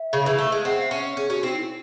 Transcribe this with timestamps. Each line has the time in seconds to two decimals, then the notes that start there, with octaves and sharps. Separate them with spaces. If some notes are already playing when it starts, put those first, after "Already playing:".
Already playing: E5
0.13 C#3
0.26 E3
0.38 A3
0.52 G#3
0.65 C4 F#5
0.82 E5
0.91 C#4
1.17 C#4 G#4
1.30 C#4 F#4
1.43 C4 D#4
1.56 E4